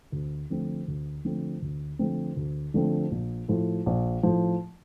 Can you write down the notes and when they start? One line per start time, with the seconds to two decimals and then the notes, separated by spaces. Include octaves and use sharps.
0.12 D2
0.50 D3 F3 A3 C4
0.88 D2
1.25 D3 F3 A3 C4
1.62 D2
1.99 D3 F3 A3 C4
2.37 D2
2.74 D3 F3 A3 C4
3.11 A#1
3.48 A2 F3
3.86 A#1
4.23 A2 F3